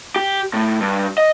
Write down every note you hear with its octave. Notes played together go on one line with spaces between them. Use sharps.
G4
A2
G2
D#5